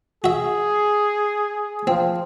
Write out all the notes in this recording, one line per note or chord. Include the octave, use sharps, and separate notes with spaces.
F#4 G#4 E5
F3 C4